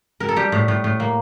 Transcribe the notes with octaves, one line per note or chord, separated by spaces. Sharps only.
A#4
A4
G3 G4
A2
A2
A2
A#3